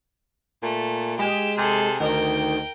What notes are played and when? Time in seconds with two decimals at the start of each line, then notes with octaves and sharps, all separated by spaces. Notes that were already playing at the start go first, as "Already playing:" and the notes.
0.63 A#2 A3
1.19 G#3 G4 E6
1.57 C3 G#4 A4
2.00 D2 D#3 A#4 G5